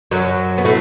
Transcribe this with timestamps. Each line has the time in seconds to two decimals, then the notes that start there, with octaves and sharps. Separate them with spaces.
0.11 F#2 F#3
0.58 B3
0.65 A2 A3